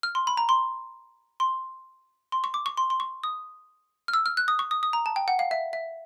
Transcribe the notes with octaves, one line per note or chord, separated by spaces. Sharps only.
F6
C6
B5
A#5
C6
C6
C6
C#6
D6
C#6
C6
C6
C#6
D#6
F6
E6
F6
F#6
D#6
C#6
D#6
D#6
A#5
A5
G5
F#5
F5
E5
E5